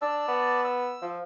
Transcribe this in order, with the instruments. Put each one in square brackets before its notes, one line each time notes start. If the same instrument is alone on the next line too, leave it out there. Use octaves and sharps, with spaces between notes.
[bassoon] D4 [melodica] D5 A5 E6
[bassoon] B3
[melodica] E6
[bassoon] F3